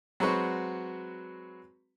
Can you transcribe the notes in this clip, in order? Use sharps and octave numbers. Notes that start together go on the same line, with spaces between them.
F#3 G#3 C4 F#4 B4